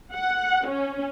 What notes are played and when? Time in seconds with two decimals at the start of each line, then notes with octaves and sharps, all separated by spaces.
0.14 F#5
0.67 C#4